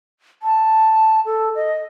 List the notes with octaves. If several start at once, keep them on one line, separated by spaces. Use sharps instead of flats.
A5
A4
D#5